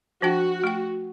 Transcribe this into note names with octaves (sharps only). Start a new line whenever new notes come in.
F3 D4 F#4 G5
A3 G5